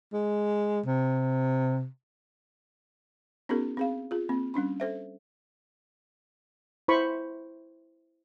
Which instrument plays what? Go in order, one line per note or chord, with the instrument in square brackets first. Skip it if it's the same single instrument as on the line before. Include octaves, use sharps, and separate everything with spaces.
[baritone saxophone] G#3
C3
[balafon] B3 C#4 D#4 F#4 G#4 A#4
C4 G#4 F5
F4 G#4
A#3 C4
G3 C#4 D4 B5
A4 C5 E5
[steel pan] E4 C5 B5 C#6